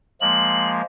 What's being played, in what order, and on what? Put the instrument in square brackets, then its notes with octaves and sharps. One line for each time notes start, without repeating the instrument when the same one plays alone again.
[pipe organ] F3 G#3 A#3 [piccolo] F#7